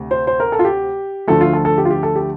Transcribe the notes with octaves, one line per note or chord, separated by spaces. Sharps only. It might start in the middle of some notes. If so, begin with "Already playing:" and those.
Already playing: D2 C3
C5
C5
A#4
A4
F4
G4
D2 D3 F3 A3 A4
F4
A4
A4
G4
F4
G4
A4
G4